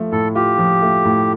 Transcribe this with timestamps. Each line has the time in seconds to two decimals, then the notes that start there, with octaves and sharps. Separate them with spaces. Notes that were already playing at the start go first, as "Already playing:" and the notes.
Already playing: F3 A3
0.12 A2 A4
0.35 F4 G4
0.58 F3
0.82 A3
1.05 A2